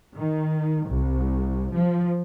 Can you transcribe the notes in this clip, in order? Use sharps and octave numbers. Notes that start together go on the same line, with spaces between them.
D#3
C2
F3